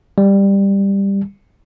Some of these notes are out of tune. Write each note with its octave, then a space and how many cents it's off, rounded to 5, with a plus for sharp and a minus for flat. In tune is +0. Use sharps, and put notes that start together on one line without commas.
G3 +10